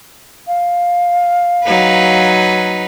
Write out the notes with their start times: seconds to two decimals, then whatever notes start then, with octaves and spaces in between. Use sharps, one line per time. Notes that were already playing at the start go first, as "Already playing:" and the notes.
0.47 F5
1.64 F#3 D#4 B4